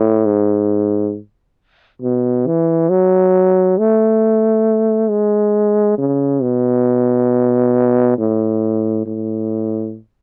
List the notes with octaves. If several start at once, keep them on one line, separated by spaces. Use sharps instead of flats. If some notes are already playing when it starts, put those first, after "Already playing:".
Already playing: A2
G#2
B2
E3
F#3
A3
G#3
C#3
B2
A2
A2